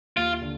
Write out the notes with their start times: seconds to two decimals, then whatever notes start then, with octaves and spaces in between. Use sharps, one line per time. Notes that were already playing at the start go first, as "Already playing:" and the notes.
0.17 D#2 F4
0.41 D3